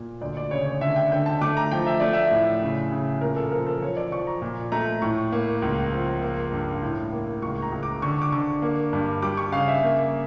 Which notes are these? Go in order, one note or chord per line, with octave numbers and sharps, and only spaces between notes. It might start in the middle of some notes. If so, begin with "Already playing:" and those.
Already playing: A#2
D2 D5
D5
C#3 C#5
C#5
D3 E5
G5
D3 G5
A5
A3 D6
A#5
F3 G5
E5
A3 D5
E5
A2
C#3
C#3
A#2 A#4
A4
F3 A#4
A4
F3 C#5
D5
F3 C#6
A#5
A#2
A3 A#5
A2 C#6
A#3
C#2
F3
A#3
G2
A2
A#3
C#2 C#6
A#5
C#2
D6
D3 C#6
D6
D3 C#6
A#3
G2
G3 D6
C#6
C#3 F5
E5
A#3